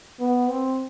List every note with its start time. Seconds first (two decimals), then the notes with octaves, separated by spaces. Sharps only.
0.20 B3
0.48 C4